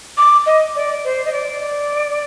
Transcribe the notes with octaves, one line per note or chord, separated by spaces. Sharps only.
D6
D#5
D5
C5
D#5
D5